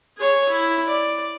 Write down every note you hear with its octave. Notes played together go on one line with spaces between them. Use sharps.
G#4 C#5
E4
D5